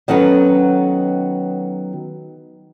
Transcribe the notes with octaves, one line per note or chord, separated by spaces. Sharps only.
D#3 F#3 B3 C#4 A4 B4